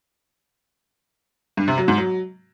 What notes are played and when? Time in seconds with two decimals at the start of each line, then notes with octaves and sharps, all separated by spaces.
1.57 G2
1.68 C3
1.78 F#3
1.88 G#2
1.98 F#3